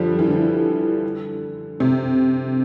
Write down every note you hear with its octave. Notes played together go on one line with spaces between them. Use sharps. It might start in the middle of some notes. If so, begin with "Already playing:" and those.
Already playing: D3 F3 G3
E3
D3
C3